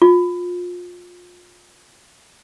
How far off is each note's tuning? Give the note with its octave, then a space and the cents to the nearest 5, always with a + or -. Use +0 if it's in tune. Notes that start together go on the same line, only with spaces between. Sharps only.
F4 +25